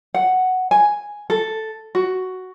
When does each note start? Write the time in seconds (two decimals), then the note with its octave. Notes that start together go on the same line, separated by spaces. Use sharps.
0.14 F#5
0.71 G#5
1.30 A4
1.95 F#4